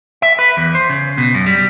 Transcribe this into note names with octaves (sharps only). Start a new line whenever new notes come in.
E5
B4
E2
C5
C#3
B2
F#2
G3